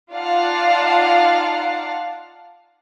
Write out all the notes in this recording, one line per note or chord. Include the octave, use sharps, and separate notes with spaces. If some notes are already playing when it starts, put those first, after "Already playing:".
D#4 F4 D5 F5 F#5 A5